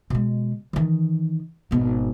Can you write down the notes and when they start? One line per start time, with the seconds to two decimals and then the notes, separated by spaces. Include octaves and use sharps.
0.10 B2 G#3
0.73 D#3 E3
1.71 G#1 B2